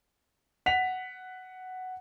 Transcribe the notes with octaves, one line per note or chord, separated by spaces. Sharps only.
F#5 B6 F7